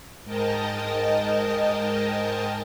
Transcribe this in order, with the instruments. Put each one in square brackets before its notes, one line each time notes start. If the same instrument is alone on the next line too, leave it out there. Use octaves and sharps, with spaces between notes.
[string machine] G#2 G#3 A#4 D#5 G5 A5